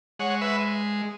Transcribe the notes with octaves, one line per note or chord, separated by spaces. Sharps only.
G#3 C#5 F#5
B4 E5